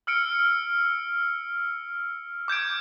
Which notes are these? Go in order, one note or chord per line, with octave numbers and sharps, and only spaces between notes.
E6 F6 C#7 D7
D6 G6 G#6 D7